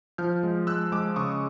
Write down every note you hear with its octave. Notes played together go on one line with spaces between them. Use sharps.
F3 F6 G6
G#3
G#3 E6 F#6
G#3 D6 E6
C#3 C#6 D#6